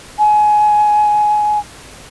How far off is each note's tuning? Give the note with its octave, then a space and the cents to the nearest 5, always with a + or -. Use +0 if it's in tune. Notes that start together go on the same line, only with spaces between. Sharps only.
G#5 +20